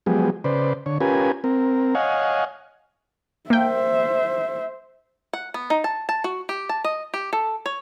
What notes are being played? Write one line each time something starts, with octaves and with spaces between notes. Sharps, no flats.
F3 F#3 G#3 B3 G4 G#4
C#3 B4 C5 D5
D3 C#5
C#4 F4 G4 A#4 B4 G#5
C4 A#4
C#5 D#5 F5 F#5 G#5
A#3 C5 E5 G5
F#5
B3
D#4
A5
A5
F#4
G4
A5
D#5
G4
A4
C#5